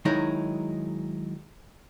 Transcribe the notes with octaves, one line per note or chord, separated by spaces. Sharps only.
D#3 F#3 G#3 D#4 E4